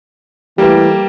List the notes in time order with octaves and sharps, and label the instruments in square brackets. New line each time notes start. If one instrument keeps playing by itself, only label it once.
[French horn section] E3 A3 [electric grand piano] G3 A#3 [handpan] G4 B4